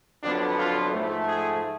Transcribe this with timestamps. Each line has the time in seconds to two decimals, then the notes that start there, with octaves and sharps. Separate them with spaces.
0.23 F2 D3 F#3 B3 D4
0.58 F4
0.93 G#2 F3 A3
1.28 G#4